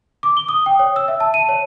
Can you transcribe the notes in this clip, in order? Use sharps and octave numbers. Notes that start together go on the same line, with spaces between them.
D6
G7
D#6
G5
C#5
E6
E5
A5
D#7
C#5